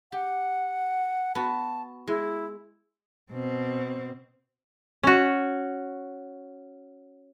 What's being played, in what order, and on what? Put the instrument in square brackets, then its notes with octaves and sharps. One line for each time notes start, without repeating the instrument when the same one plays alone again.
[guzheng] G4 [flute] F#5
[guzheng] B3 F#4 B5 [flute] A5
[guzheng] G#3 [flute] E4
[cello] B2 C4
[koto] C#4 F#4